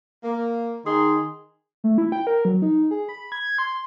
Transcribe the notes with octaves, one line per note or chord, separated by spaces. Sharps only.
A#3
D#3 D#4 G#4 C6
A3
E4
G5
A#4
F#3
D#4
G#4
B5
G#6
C6